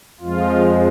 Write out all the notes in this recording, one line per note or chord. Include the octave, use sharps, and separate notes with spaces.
F2 F3 G#3 F4